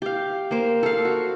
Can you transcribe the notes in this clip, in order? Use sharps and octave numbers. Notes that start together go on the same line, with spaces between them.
G4 F5
A#3 C5
A4 F5
F#4